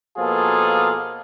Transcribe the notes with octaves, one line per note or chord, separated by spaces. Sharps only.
B2 F3 A#3 F4 G#4 A4